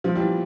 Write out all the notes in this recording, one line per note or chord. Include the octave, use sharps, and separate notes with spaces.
F3
E3 G3